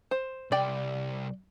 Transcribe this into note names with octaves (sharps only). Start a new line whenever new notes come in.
C5
C2 D5 G5